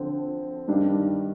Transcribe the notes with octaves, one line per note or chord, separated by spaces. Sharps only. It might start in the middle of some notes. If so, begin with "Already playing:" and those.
Already playing: D3 F3 C4
G2 D#3 G3 D4